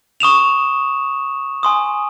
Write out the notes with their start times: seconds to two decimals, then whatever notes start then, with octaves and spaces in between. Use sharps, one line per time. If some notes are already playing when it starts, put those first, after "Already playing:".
0.20 C#6 D#6 E7 F7
1.63 G#5 C6 D#6